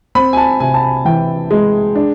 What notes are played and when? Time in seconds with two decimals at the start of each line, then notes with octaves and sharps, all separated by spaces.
0.15 C4 B5
0.33 G#5
0.37 A5
0.60 C3 G#5
0.74 A5
0.82 G#5
1.05 E3 G5
1.51 G#3
1.95 D4